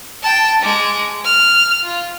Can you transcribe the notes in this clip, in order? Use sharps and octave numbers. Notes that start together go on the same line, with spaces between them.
G5 A5
G#3 D6
F6
F4